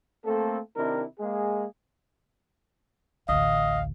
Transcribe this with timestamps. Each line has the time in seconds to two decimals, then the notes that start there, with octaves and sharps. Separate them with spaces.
0.25 A3 A#3 C4 A4
0.76 C3 D#3 D4 E4 A#4
1.18 G#3 A#3 G#4
3.29 A1 D2 D#5 F5